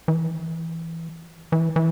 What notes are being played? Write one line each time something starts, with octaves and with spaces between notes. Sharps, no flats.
E3
E3
E3